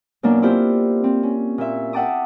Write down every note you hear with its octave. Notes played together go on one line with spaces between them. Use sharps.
F#2 B2 A#3 D4
C4 D4 E4 F4 G4 C5
C4
C#4
A#2 E5
E5 F#5 G5 A5 D6 D#6